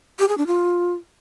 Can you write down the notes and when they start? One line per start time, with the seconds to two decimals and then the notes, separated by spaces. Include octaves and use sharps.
0.19 G4
0.28 G#4
0.38 D4
0.47 F4